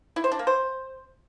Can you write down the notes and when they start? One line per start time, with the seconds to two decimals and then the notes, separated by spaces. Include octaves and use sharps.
0.16 E4
0.24 C5
0.32 D4
0.39 A#3
0.47 C5